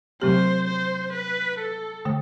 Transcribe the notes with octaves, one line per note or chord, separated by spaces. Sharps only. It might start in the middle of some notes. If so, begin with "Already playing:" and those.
C3 F#3 A3 C4 G4 C5
C5
B4
A4
D3 A3